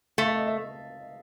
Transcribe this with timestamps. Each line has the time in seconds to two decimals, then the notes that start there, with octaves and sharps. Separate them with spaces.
0.18 A3 F5
0.28 E5
0.37 D#5
0.47 E5